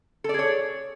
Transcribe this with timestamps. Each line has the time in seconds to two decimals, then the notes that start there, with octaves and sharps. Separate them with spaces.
0.24 A4
0.29 D5
0.34 G#4
0.39 C#5